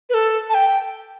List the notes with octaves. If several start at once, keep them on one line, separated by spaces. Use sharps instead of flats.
B4
A4
A5
G5